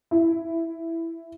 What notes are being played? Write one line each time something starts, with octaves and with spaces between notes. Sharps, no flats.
E4